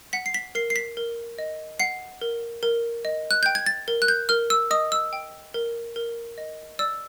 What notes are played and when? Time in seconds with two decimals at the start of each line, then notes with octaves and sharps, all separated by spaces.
0.13 F#5 B6
0.26 C7
0.34 B6
0.55 A#4 C7
0.70 C7
0.76 B6
0.97 A#4
1.38 D#5
1.80 F#5 C7
2.21 A#4
2.63 A#4
3.05 D#5
3.31 F#6
3.43 G5 G6
3.55 G#6
3.66 A6
3.88 A#4
4.02 F#6
4.08 G6
4.29 A#4 F6
4.50 E6
4.71 D#5 D#6
4.92 E6
5.13 G5
5.54 A#4
5.96 A#4
6.38 D#5
6.79 D5 E6